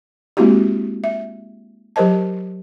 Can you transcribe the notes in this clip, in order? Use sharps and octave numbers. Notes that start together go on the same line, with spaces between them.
G#3 A#3 C4 E4 F#4 G4
E5
F#3 G4 A#4 C5 D#5 A5